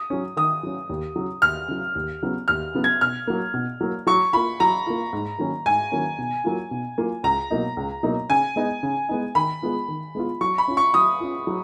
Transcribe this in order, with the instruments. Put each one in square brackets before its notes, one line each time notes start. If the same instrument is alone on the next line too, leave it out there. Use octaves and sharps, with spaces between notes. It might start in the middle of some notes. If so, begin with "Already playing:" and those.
Already playing: [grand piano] D#6
[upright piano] F#3 C#4
[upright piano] D#3 [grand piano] D#6
[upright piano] F#3 C#4
D#2
C#3 F#3
[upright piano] D#2 [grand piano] F6
[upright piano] C#3 F#3
D#2
C#3 F#3 B3
[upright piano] D#2 [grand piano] F6
[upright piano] C#3 F#3 B3
[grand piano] G#6
[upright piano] B2 [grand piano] F6
[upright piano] F#3 A#3
B2
F#3 A#3
[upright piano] F#3 [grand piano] C#6
[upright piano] A#3 F4 [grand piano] B5
[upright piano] F#3 [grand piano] A#5
[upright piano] A#3 F4
G#2
D#3 F#3 A#3 C#4
[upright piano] G#2 [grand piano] G#5
[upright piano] D#3 F#3 A#3 C#4
B2
F#3 A#3 F4
B2
F#3 A#3 F4
[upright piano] C#2 [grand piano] A#5
[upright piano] B2 F#3 A#3 D#4
C#2
B2 F#3 A#3 D#4
[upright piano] C#3 [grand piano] G#5
[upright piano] G#3 B3 D#4
C#3
G#3 B3 D#4
[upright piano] D#3 [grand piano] B5
[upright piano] G#3 B3 F4
D#3
G#3 B3 F4
[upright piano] F#3 [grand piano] C#6
[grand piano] B5
[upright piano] C#4 F4
[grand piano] C#6
[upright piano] F#3 [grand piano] D#6
[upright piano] C#4 F4
F#3